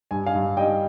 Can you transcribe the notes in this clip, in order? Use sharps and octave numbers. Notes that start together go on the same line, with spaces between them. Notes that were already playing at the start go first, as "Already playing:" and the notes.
G2 G#5
F5 G#5
G2
G3 D#5 G5